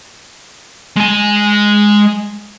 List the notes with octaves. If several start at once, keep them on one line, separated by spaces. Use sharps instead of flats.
G#3 G#5